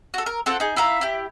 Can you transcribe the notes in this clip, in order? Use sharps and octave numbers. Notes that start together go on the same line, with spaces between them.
F#4 A4
A#4
C4 F4 A4 F#5
D#4 G#4
E4 E5 F5 A#5
E4 G4